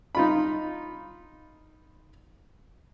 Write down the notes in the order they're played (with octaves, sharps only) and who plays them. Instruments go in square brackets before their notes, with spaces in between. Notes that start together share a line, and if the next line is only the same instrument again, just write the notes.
[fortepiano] D#4 F4 B5